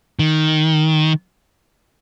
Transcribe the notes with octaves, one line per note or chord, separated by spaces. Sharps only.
D#3